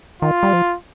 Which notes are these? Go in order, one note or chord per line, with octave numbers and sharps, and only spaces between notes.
D#3 F4
G3
F3